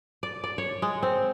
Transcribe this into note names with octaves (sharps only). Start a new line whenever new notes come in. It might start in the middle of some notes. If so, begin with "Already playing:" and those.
D5
D5
C#5
G#3
C4